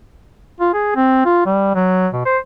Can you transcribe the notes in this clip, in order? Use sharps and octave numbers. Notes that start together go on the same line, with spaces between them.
F4
G#4
C4
F4
G3
F#3
B2
C5